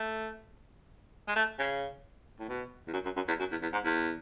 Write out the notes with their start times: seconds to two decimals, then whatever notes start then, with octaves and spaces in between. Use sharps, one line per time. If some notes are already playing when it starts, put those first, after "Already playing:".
Already playing: A3
1.28 G#3
1.36 A3
1.58 C#3
2.39 A2
2.49 B2
2.87 E2
2.93 F#2
3.05 F#2
3.16 F#2
3.28 E2
3.39 F#2
3.51 E2
3.62 E2
3.73 G#2
3.84 E2